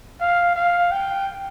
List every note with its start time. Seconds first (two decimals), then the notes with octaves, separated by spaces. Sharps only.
0.21 F5
0.56 F5
0.91 G5